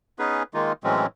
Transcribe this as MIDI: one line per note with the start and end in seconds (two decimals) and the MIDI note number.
0.19 0.43 59
0.19 0.43 61
0.19 0.43 63
0.19 0.43 68
0.19 0.43 71
0.54 0.72 51
0.54 0.72 56
0.54 0.72 58
0.54 0.72 63
0.54 0.72 65
0.84 1.06 45
0.84 1.06 52
0.84 1.06 54
0.84 1.06 56
0.84 1.06 60
0.84 1.06 61